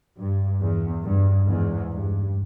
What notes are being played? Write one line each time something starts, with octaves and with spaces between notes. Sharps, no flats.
G2
E2
G2
E2 G#2
G2